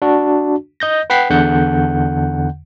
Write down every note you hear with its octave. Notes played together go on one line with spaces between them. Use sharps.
D4 F#4
D#5 G6 A#6
B4 F#5 G5 B6 C7
E2 D3 F#5 G6